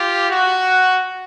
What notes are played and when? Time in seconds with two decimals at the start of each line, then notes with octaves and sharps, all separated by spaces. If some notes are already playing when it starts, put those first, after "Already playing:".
Already playing: F4 G4
0.30 F#4